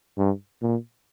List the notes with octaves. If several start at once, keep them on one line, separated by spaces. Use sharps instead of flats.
G2
A#2